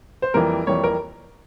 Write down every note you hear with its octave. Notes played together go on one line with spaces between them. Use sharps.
C5
F2 E3 G3 A#3 A#4
F2 E3 G3 A#3 C#5
A#4